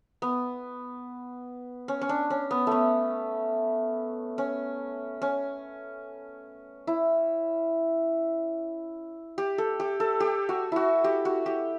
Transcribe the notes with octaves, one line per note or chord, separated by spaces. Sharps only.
B3
C#4
C#4
D4
C#4
B3
A3 B3
C#4
C#4
E4
G4
A4
G4
A4
G4
F#4
E4 F#4
G4
F#4
G4